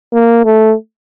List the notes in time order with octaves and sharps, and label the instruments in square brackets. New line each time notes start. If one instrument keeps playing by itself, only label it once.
[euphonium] A#3
A3